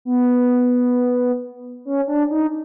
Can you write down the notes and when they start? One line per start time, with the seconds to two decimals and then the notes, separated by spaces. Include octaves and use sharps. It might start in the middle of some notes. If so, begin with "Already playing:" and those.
0.05 B3
1.85 C#4
2.07 D4
2.31 D#4